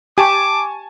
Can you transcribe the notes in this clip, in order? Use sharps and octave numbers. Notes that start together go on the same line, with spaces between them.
G4 G#5 A5 C#6 D6